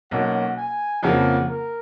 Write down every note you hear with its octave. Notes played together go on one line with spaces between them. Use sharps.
B1 B2 A#3 C#4 F#5
G#5
F2 C#3 F3 A#3 F4 F#5
A#4